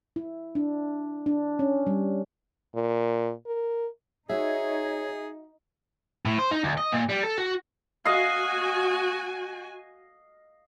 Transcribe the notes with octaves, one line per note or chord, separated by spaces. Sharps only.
E4
D4
D4
C#4
G3
A#2
A#4
D#4 F#4 G#4 C#5 E5
A2
C5
D#4
D2
D#5
A#2
G3
A4
F#4
F#4 D#5 F5 G#5